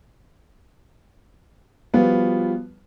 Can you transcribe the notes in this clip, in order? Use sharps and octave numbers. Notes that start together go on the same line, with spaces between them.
F3 G3 B3 F4 F#4